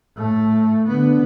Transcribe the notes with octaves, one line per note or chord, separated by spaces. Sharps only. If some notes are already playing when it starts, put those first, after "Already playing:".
A2 A3
D3 B3